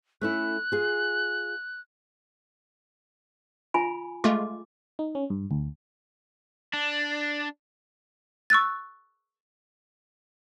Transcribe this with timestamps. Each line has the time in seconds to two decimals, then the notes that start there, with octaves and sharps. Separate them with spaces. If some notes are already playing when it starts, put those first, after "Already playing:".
0.21 A3 C#4 E4 F#6
0.72 F4 G#4
3.74 F4 G#5 B5
4.24 G#3 A3 F4 D6
4.99 D#4
5.15 C#4
5.30 G2
5.51 D2
6.73 D4
8.50 C#6 E6 F#6 A6